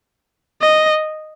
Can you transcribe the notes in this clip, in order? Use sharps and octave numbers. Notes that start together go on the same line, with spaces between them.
D#5